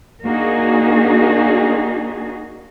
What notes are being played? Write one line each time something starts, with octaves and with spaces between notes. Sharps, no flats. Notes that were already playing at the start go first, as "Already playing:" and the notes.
A#3 D4 D#4 F#4 G#4